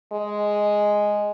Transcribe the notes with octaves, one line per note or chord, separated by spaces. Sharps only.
G#3